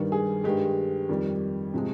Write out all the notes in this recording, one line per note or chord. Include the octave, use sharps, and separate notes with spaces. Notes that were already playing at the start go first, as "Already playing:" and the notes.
Already playing: G2 D#3 G3
G#4
G2 D#3 G#3 G4
F2 D#3 G3
C3 F3 G#3